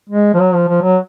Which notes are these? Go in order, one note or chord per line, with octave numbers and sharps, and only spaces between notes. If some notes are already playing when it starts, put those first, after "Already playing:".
G#3
F3
F#3
F3
F3
F#3